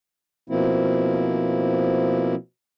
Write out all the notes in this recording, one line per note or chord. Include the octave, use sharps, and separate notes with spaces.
B2 F3 A#3 C4 E4